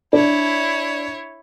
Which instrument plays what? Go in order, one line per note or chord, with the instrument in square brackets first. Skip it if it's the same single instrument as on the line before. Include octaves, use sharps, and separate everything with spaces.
[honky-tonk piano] D4 [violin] E4 C#5